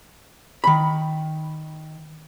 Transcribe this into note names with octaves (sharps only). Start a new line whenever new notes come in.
D#3 B5